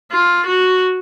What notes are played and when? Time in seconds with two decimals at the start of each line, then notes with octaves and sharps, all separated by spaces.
0.12 F4
0.46 F#4